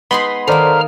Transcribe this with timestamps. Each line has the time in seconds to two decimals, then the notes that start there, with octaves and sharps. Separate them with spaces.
0.11 G#3 B3 D#4 G#4 B5 C6
0.48 D#3 A#3 A4 C5 D5 A#5 F6